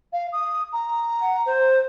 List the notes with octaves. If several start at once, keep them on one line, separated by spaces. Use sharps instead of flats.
F5
D#6
A#5
F#5
C5